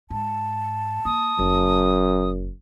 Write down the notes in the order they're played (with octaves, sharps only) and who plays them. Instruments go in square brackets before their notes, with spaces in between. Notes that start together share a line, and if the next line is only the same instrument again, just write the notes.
[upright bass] G#2 [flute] A5
[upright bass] A#3 [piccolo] D#6
[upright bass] F#1 [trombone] F#2